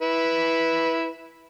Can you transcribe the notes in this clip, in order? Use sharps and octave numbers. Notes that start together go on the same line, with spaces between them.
E4 B4